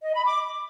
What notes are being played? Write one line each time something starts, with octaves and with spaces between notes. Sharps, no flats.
D#5
B5
D6